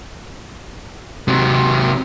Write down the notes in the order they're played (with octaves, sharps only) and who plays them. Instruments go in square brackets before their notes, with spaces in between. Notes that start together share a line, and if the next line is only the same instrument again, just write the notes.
[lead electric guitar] C3 F#3